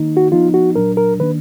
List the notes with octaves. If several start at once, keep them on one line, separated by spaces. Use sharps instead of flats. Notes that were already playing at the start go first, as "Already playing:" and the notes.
Already playing: D#3 A#3 D#4
F#4
F3 B3 D#4 F4
F#4
A#2 F#3 D4 A#4
A#4
D#3 A#3 D4 B4